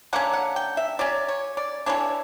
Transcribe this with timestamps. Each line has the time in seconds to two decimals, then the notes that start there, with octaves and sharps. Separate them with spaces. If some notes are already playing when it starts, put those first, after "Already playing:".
0.13 D3 A#3 C#4 F#5
0.33 F#5
0.56 G5
0.77 E5
0.99 F#3 C#4 D5
1.28 C#5
1.57 D5
1.86 C#3 E3 B3 D4 C#5